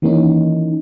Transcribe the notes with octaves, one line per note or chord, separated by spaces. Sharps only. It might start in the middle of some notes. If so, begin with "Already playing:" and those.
D#3 E3 A#3 C#4 D#4